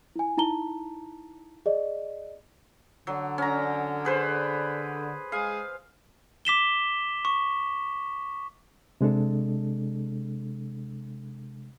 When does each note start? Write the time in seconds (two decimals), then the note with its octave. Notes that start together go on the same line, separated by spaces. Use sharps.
0.16 E4 G#5
0.37 D#4 E4 A5 A#5 G7
1.66 G#4 D5 D#5
3.07 D3 F#3
3.38 C#4 A#5
4.05 G#4 B4 C5
5.32 G#3 G#4 F5
6.45 D6 B6 E7 G7
7.25 C#6
9.01 C3 G#3 D4 A4